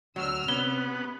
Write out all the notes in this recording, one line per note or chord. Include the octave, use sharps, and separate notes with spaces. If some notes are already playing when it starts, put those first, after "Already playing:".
D2 F#3 E6 F6
C3 B3 C#4 G7